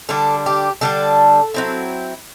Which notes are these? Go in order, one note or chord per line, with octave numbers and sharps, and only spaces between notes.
D3 G3 D4 A4
G4
D3 G3 D4 A4
F#3 C4 E4